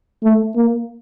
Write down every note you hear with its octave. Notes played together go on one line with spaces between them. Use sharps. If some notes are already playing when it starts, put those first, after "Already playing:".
A3
A#3